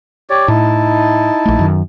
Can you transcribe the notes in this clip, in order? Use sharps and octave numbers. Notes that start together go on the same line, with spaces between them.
G4 C#5 D5
A2 D#4 E4 A5
A#1 A3
F#2 D#3